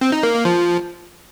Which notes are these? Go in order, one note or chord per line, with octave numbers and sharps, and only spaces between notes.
C4
D#4
A#3
A#3
F3